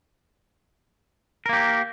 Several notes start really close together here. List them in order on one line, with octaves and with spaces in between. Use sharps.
A#4 A#3 G4